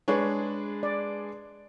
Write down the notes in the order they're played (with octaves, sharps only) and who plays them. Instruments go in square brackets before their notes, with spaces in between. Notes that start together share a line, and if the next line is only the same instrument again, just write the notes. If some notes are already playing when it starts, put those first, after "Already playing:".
[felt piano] G#3 D4 G#4 B4 [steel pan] C#5
[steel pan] D5